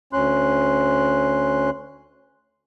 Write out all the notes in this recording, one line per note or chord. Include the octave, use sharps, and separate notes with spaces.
D2 C#4 C6 F#6